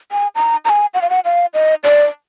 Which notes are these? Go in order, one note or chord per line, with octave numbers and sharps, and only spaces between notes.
G#5
A#5
A#5
G#5
F#5
F5
F#5
F5
D#5
D5